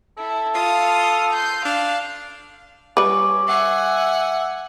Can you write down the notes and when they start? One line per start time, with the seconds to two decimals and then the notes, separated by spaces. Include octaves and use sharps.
0.18 E4 A4
0.55 F4 F5 D#6
1.33 C6 G6
1.65 D4 F5
2.97 G3 C#4 B4 D6
3.47 E5 F#5 G#5